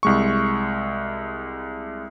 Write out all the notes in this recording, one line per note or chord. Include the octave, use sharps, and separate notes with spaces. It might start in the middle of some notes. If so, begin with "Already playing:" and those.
C2 G#3 C#6